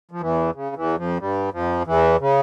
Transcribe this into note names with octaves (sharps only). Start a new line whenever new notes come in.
F3
E2 E3
C#3
E2 E3
F2 F3
G2 G3
F2 F3
E2 E3
C#3